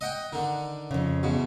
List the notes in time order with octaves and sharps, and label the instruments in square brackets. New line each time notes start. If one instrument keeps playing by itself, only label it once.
[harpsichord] D#5 F#5 G5
D3 D#3
[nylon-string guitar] F2 C#3
[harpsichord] E2 B2